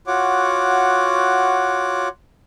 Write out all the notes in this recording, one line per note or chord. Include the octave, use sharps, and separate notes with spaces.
F4 F#4 C#5 F#5 D6